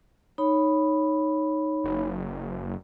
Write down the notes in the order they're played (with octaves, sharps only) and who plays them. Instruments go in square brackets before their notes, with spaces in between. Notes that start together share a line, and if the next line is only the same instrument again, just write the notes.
[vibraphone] D#4 C#5 B5
[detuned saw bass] F#1